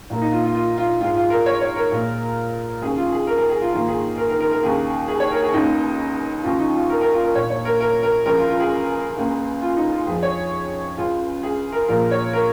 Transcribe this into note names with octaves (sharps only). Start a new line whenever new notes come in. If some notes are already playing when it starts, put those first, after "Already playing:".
A#2 A#3
D#4
F4
F4
F4
F4
G#2 G#3 F4
F4
A#4
C#5
C#5
A#4
A#2 G#3
D#2 C#3 G#3 G#4
F4
G#4
A#4
A#4
G#4
F4
G#2 D#3 A#3 F4
G#4
A#4
A#4
A#4
A#4
D#2 C#3 A#3 G#4
G#4
C#5
A#4
G#4
C#2 C#3 A#3 D#4
D#2 C#3 G#3 F4
D#4
F4
A#4
A#4
F4
A#4
A#2 A#3 C#5
C#5
A#4
A#4
A#4
C#2 C#3 F3 G#3 A#4
F4
F4
G#4
C#2 C#3 A#3
F4
D#4
F4
F2 F3 G#3 G#4
C#5
C#2 C#3 G#3 F4
G#4
A#4
A#2 F3 G#3 A#4
C#5
A#4